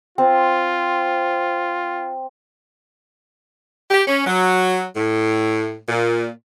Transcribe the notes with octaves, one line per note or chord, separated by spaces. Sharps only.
C4 F4
G4
C#4
F#3
A2
A#2